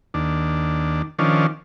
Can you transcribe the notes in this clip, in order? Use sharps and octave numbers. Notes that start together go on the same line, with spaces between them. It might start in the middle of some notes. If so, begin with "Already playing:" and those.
D#2 D4
D#3 F3 C#4 D4